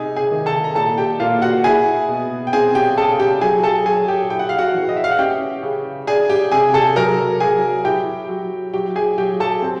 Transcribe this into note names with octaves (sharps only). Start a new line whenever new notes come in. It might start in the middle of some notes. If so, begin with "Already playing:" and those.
Already playing: C3 D#4 G#4 G#5
G#4 G#5
D#3
A4 A5
A#5
A#2 A4 A5
G4 G5
A#2 F4 F5
F#4 F#5
E4 G#4 G#5
B2
G5
C4 G#4 G#5
G4 G5
C#3 A4 A5
G4 G5
F#3 G#4 G#5
A4 A5
F#3 G#4 G#5
G4 G5
E4 G5
F#5
F5
F#4 F#5
E3
D#5
E5
F5
F#5
C#4 G4 G5
C#3
D4 G#4 G#5
G4 G5
C3 G#4 G#5
A4 A5
F#3 A#4 A#5
F#3 G#4 G#5
E4 G4 G5
F#3
F#3 G4 G5
G#4 G#5
F#3 G4 G5
A4 A5
C4